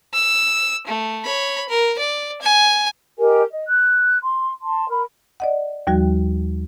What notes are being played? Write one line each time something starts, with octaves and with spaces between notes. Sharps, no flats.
E6
A3
C#5 B5
A#4
D5
G#5
G4 A#4 D#5 G#5
D#5
F#6
C6
A5 C6
A#4 B5
D5 D#5 F#5
D#2 F3 G3 F#4